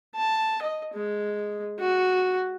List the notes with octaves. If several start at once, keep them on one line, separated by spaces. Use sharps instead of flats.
A5
D#5
G#3
F#4